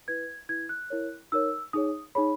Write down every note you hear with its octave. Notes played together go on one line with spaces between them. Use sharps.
E4 B4 G#6
E4 B4 G#6
F#6
E4 A#4 C#5
D#4 A#4 C#5 E6
D#4 G#4 C#5 D#6
D#4 G#4 C#5 B5